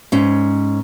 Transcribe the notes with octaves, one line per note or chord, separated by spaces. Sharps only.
G#2 C#4